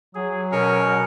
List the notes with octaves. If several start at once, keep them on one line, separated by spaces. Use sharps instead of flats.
F#3 G#4
B2 C#4 A#4